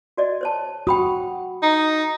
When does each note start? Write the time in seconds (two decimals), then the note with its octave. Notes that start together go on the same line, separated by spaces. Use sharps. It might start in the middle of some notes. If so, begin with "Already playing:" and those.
0.17 F#4 D5 D#5
0.41 C5 C#5 A5
0.87 F#4 G5 B5 D#6
1.63 D#4